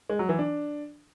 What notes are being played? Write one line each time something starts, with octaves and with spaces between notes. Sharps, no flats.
G#3
F#3
E3
D4